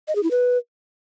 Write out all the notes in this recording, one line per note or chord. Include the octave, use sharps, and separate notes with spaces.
D#5
G#4
E4
B4